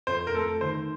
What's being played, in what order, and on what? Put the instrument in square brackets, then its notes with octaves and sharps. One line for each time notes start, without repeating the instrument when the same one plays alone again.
[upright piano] F2 [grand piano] C5
[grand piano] A#4
[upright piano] A3 [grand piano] A4
[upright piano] D#3 [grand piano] C5